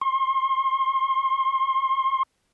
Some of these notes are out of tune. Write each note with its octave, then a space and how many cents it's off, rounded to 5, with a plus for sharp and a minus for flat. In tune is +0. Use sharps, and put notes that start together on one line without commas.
C6 +35